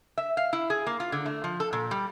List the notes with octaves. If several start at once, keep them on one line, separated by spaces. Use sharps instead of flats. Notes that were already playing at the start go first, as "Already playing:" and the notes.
E5
F5
E4
G#4
A#3
F4
D3
A3
F3
A4
A#2
G3